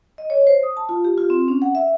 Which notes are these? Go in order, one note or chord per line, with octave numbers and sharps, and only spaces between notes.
D#5
C#5
C5
D#6
A5
F4
G4
F4
C4
C#4
F#5
E5